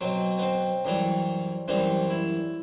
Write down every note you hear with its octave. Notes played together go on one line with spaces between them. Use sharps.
B2 F#3 C4
B3
C4
F#2 E3 G3
F#2 E3 G3 C4
E4